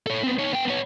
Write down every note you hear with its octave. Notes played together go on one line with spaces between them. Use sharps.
A4 C#5
B3 C4
D#4 C#5
B3 G5
B3 C#5